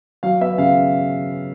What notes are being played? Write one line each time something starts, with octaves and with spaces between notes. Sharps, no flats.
F#3 F5
B3 E5
C#3 F5